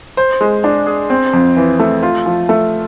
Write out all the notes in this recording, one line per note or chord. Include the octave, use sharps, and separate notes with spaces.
C5
G#3
D4
G#4
C4
F2
E3
A3
F4
F3
A3